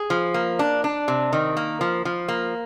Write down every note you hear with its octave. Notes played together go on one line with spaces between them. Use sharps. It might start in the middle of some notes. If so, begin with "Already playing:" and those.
Already playing: G#4
F3
A#3
D4
D4
C3
D#3
A#3
F3
F3
A#3